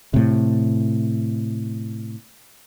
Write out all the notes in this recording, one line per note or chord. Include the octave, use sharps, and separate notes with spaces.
A2 C3